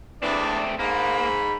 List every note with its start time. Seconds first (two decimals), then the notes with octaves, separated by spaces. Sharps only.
0.23 E2 E3 A3 C4 D4 D5
0.79 G#2 A#3 B5